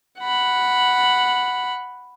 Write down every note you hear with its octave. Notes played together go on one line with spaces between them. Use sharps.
F#5 B5